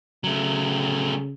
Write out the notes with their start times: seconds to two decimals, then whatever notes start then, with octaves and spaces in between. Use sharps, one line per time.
0.24 C#3 F#3 A3